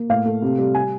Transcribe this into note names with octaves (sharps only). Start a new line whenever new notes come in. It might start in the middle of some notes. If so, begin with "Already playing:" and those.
Already playing: A#3
A2 F5
A3
C3
G3
G#5